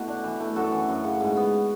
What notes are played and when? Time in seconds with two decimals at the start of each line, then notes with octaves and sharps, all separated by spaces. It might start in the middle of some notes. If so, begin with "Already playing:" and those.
Already playing: B2 A3 E4 F#4
0.08 D4
0.24 E3
0.40 A3
0.56 F#2 F#4 A4
0.72 E3
0.89 F#2
1.04 C#3
1.20 G#2
1.37 B3